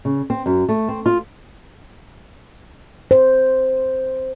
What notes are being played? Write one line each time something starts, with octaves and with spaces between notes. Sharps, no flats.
C#3
C4
F#2
A3
C4
F4
C5